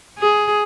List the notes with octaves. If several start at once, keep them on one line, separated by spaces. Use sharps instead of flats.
G#4